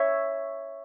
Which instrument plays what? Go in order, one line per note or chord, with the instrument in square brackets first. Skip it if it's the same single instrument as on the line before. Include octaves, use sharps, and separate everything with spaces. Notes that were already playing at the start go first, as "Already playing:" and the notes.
Already playing: [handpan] C#5 E5